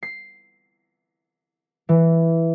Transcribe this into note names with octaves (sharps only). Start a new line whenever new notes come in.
C7
E3